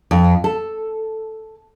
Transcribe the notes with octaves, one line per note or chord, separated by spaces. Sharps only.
F2
A4